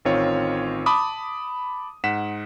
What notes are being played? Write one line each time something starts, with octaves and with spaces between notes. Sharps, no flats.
A1 D#3 C4 F4 C#5
A5 B5 D6 D#6
G#2 F#5 B6 E7